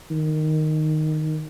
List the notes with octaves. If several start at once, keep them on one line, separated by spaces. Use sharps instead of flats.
D#3